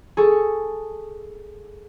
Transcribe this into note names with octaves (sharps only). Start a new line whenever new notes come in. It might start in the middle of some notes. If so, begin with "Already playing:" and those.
G#4 A4 C#6